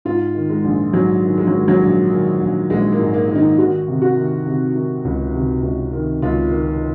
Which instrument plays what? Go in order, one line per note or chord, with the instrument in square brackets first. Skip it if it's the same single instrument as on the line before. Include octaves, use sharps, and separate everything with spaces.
[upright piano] G#2 F4
D#3
G#3
A#1
G#2 F#3
D#3
G#3
D#3 F#3
F#3
A#1
D#3
A#1
A#1 G#3
A#3
G#2
A#3
D#3
D#4
D#3 F#4
C3
F#4
D#3
C3
D#3
C#2
C3
C#2
D#3
C#2 F4
D#3